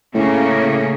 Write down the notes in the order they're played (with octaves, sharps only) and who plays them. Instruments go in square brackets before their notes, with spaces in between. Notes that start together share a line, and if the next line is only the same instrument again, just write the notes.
[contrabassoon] A2 [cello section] C#3 A#3 C#4